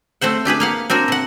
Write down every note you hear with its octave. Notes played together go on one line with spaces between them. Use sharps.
A3 C4 C5 F#5
D4 G4 G#4 B4
A#3 F5 F#5
C4 D4 F#4 A#4
C3 F#5